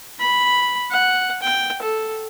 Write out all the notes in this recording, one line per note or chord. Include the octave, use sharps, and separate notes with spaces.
B5
F#5
G5
A4